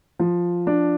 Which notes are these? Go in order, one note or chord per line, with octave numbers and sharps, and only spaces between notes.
F3
D4